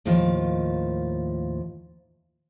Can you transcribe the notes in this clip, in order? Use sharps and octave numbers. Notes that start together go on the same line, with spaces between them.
D#2 A2 D#3 F3 F5